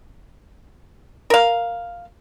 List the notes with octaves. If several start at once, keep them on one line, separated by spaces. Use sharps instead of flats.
A#4 F5